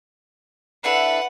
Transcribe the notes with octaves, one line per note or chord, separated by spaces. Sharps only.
D4 E4 A4 B4 F#5